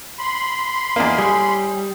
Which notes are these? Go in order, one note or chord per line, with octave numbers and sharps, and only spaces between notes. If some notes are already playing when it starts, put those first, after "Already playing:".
B5 C6
E2 A#3 D#4 F4 D#5
A2 G3 G#4 G#5